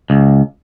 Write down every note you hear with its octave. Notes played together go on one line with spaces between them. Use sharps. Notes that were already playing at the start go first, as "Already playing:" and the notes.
C#2